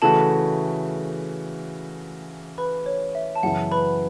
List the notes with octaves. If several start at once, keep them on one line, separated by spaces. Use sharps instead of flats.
C#3 E3 A3 F#4 A4 A5
B4 B5
C#5
E5
A5
F#2 C#3 E3 B3 E4 F#5
B4 B5